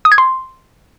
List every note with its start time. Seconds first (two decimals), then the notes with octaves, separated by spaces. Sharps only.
0.05 D#6
0.12 G#6
0.18 C6